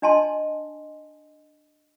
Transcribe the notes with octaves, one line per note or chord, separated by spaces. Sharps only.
D4 D#5 G#5 A5 C6